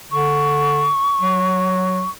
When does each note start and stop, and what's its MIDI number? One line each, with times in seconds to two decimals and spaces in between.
0.12 0.90 50
0.12 2.10 85
1.21 2.04 54